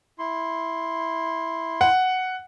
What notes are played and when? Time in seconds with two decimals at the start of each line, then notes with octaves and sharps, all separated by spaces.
0.19 E4 C6
1.81 F#5